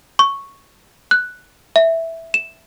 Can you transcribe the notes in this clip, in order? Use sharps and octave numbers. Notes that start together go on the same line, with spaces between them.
C#6
F#6
E5
E7